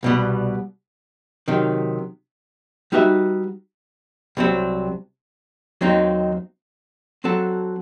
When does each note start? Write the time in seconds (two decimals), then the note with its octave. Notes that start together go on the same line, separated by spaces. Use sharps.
0.03 C2 B2 G3 B3
1.48 C3 D#3 F#3
2.92 G3 D#4 F#4 B4 E5
4.37 C2 C3 F#3 C4
5.81 D#2 D#3 F#3 C4 D#4
7.24 F#3 C4 F#4 A4